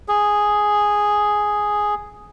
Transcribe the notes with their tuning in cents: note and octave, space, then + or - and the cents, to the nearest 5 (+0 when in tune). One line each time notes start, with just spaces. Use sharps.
G#4 +0